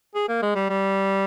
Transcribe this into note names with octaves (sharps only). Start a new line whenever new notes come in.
G#4
A#3
G#3
G3
G3